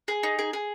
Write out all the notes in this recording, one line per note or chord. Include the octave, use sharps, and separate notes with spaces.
G#4
D#4
G#4
G#4